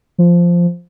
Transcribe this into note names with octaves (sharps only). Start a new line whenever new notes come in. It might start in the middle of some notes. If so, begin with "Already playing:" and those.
F3